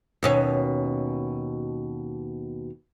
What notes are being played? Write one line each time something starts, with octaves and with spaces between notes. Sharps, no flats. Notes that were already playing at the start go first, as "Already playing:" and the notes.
D#2 B2 C#4